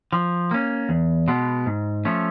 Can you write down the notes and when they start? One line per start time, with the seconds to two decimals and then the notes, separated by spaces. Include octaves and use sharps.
0.13 F3
0.51 A#3 C#4
0.89 E2
1.28 B2 G#3 B3
1.66 G#2
2.05 F3 A3 C#4